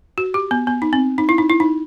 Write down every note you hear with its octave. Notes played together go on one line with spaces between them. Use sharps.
F#4
G4
B3
B3
D#4
C4
D#4
E4
D#4
E4
D#4